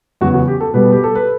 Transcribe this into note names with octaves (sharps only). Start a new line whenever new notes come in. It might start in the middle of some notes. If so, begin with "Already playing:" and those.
E2 C#3 F#3 B3 F#4
F#4
G4
A4
B2 G3 B3 B4
G4
A4
B4